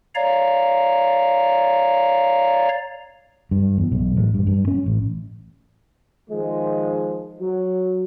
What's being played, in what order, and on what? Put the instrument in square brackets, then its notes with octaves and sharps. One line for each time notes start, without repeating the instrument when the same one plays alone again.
[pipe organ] C#5 D5 F5 A#5
[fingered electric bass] G2
E2
B1
A1
G2
G2
C#4
A1
[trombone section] D#3 F3 G#3
F#3